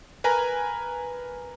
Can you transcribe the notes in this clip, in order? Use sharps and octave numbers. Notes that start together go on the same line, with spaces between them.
A#4 B4 G#5 A#5